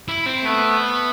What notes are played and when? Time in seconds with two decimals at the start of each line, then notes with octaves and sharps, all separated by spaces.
0.08 E4
0.26 C4
0.45 A3 B3